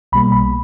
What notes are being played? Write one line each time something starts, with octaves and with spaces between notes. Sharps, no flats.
B1 B2 G3 A#3 B5
B5